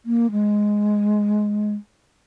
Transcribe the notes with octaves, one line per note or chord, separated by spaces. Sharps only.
A#3
G#3